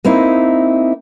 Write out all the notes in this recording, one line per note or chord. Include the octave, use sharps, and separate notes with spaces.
A#3 C4 D#4 E4